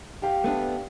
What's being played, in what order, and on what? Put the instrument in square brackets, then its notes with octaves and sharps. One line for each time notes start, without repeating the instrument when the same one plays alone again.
[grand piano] G4 F5 G5
[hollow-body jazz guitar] A3 B3 D4